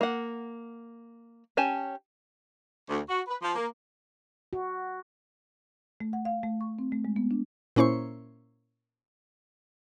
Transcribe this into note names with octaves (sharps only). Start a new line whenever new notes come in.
A#3 F#5
C#4 G4 G#5 A5
D2
F#4
B4
F3
A#3
F#4
A3
F#5
F5
A3
C#6
C4
A3
G#3
B3
D4
A#2 A#3 C#4 E4 C5 C#6